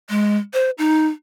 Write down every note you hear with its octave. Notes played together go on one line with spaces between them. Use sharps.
G#3
C5
D#4